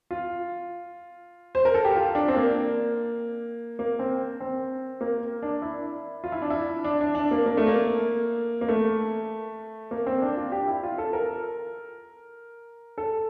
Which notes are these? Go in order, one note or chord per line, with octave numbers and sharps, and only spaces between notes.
F4
C5
A#4
A4
G4
F4
D4
C4
A#3
A#3
C4
C4
A#3
D4
E4
F4
E4
D4
E4
D4
D4
D4
A#3
A#3
A3
A#3
A#3
A3
A#3
C4
D4
F4
G4
E4
F4
A4
A#4
A4